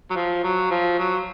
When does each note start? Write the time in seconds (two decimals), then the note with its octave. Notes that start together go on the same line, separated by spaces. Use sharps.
0.11 F#3
0.16 F3
0.44 F#3
0.71 F3
0.99 F#3